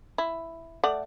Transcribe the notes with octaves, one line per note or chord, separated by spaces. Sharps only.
E4
A3 D5 F#5